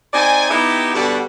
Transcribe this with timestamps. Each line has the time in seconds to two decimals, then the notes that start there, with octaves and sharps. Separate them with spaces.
0.13 C4 D#4 D5 G#5
0.50 B3 D#4 E4 G4
0.95 G2 B2 D3 F#4 G4 D5